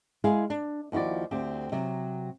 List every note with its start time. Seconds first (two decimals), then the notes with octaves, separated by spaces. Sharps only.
0.24 G#3 E4 G#4 F5
0.50 D4
0.92 D#2 F3 E4 F#4 D5
1.31 D2 C4 G4
1.72 C3 F#3